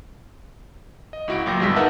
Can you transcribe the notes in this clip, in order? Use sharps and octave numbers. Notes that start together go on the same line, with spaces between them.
D#5
C#2 E4 F#4 F#5 D7
A1 A#2 F#3 G5 A#6
G1 G2 G3 G#3 E6 B6
D#4 A#4 B4 E5 F#5 A5